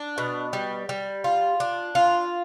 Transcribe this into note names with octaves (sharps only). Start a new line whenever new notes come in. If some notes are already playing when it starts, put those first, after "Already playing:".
Already playing: D4
B2
G3
G3
F4
D4
F4